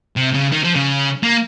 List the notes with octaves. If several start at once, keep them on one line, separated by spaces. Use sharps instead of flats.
C3
C#3
D#3
F3
C#3
A#3